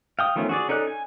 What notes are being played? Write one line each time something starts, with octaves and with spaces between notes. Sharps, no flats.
F5 G5 D#6
D#3 F3 A3 B3 C#4
F#4 G#4 D5
C#4 D#4 A4 D5 F#6
G#5